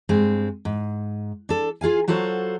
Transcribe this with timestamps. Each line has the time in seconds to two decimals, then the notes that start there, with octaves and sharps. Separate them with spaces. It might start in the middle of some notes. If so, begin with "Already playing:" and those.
0.09 G2 G#3 C4
0.65 G#2
1.49 D4 A4
1.81 F4 G#4 F5 G#5
2.08 F#3 F4 F#4 A4 C5